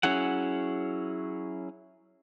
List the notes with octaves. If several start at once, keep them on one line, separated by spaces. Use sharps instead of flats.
F#3 C#4 E4 G#4 F#5